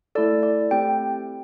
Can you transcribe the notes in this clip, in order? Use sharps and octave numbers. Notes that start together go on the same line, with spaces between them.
A3 E4 A4 D5
D5
A3 C4 G4 G5